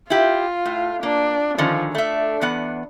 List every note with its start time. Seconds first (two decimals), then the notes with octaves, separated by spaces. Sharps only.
0.10 E4 F4 G4
0.66 A2
1.03 A#3 D4
1.58 D3 D#3 F3 C#4
1.95 A3 D4 E5
2.41 E2 B3 F#5